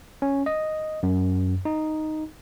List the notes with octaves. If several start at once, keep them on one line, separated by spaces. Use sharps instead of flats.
C#4
D#5
F#2
D#4